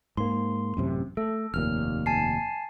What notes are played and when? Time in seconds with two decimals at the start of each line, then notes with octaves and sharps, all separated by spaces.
0.17 G#2 A#3 C6
0.77 A1 F#2 C3
1.17 A3 A4
1.54 F1 D#2 A#2 F6
2.06 G#5 A5 C7